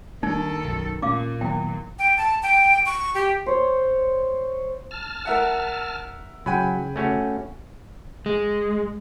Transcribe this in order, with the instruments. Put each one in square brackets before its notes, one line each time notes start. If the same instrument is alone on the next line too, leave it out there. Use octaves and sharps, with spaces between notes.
[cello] D#3 A4 [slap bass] G3 A#3 D4 [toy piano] D#4
[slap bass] B1 F#2
[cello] A#2 [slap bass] C#4 [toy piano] F5 D6
[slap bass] D#3 F#3 B3 [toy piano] E4 G5
[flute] G5
A5
G5
C#6
G4
[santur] C5 C#5
[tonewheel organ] A5 F6
[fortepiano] A#4 E5 F#5
[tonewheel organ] C#3 [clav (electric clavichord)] F#3 [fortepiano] G5 G#5 B5
[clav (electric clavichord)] A3 C#4 F#4
[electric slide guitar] G#3